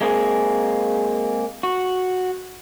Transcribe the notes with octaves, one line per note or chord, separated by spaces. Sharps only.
G#3 A#3 C4 D#4 G#4
F#4